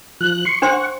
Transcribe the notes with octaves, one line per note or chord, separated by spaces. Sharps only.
F3 F#6
C6 C#6
D4 C5 F#5 C6 C#6